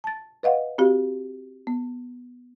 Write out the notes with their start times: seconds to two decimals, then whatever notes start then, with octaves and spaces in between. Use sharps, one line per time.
0.04 A5 A6
0.43 B4 D#5 F5 F#5
0.78 C4 F#4 G4 F5
1.67 B3